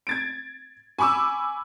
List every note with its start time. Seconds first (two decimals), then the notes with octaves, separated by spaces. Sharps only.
0.07 G#6 A6 D7
0.99 G#5 B5 C#6 D6 E6